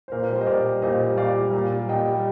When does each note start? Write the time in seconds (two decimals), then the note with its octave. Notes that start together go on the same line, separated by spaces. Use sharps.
0.08 C5
0.12 A#2 A#4
0.18 C5
0.23 A#4
0.29 G3
0.36 C5
0.41 D#5
0.47 A#2 A#4 D5
0.65 G3
0.82 A#2 C5 D#5
1.01 G3
1.17 A#2 D5 F5
1.35 G3
1.53 A#2
1.71 G3
1.88 A#2 D#5 G5
2.07 G3